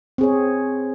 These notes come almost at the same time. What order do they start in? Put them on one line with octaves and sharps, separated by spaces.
C4 G#4 C#5